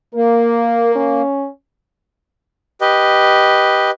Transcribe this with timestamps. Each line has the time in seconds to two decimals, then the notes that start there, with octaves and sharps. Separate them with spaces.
0.15 A#3 A#4
0.96 C#4
2.81 G4 B4 D#5